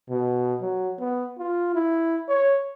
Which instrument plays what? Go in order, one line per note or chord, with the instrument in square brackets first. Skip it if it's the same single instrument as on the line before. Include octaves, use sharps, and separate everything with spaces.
[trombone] B2
F#3
B3
F4
E4
C#5